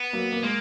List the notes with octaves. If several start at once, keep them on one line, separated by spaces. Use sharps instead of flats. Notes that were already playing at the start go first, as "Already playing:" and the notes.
Already playing: B3
F#3 A#3
A#3
G#3 A#3